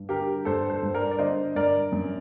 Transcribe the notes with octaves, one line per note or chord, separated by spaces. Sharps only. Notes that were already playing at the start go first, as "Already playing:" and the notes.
Already playing: G2
D3 G4 A#4
G2 A4 C5
A4 C5
G2
A#4 D5
D5
D3 C5 D#5
G2 A#4 D5
F#2